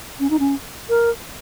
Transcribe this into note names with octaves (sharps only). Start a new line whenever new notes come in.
C#4
D#4
C#4
A#4